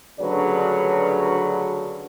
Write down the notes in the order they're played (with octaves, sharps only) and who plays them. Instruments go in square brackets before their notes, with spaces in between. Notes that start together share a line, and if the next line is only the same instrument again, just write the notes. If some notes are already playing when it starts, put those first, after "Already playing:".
[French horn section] D2 G2 C#3 F#3 B4 C#5